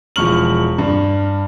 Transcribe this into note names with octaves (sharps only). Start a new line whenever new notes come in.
E1 F3 C#6 F6 F#7
G2